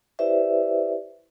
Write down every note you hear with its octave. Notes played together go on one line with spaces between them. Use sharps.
E4 G4 B4 C5 D5 E5